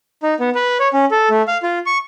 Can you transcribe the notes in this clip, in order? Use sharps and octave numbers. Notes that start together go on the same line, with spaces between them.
D#4
B3
B4
C#5
C#4
A4
A3
F5
F4
C#6